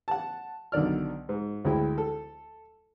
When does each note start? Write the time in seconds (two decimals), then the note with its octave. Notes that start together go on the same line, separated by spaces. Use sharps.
0.08 F#5 A5
0.72 B1 D3 D#3 D5 F6
1.29 G#2
1.65 D2 G#3 E4 G5
1.98 A4